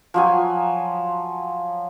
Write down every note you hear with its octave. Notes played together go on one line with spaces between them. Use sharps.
F3 F#3 G#5